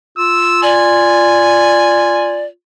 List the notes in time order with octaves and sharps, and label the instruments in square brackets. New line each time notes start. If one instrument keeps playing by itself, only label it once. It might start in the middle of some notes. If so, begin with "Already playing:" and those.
[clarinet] F4 [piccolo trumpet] E6
[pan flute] D5 [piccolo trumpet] G#5